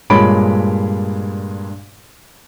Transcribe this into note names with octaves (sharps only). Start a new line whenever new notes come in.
G2 A#2 G#3 C#5 B5 D7